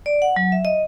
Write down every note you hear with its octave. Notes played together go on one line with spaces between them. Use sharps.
D5
F#5
F#3
E5
D#5